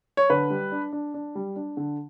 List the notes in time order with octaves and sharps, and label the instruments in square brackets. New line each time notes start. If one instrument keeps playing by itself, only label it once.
[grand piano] C#5
D3 B4
G3
D4
D4
D4
G3
D4
D3